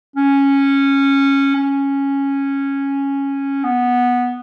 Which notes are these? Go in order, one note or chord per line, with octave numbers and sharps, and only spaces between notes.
C#4
C#4
B3